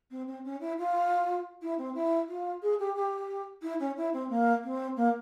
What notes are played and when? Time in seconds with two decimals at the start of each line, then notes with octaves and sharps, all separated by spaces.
0.11 C4
0.27 C4
0.44 C#4
0.60 E4
0.78 F4
1.62 E4
1.78 C4
1.94 E4
2.28 F4
2.62 G#4
2.79 G4
2.95 G4
3.62 E4
3.79 C#4
3.97 E4
4.13 C4
4.29 A#3
4.64 C4
4.96 A#3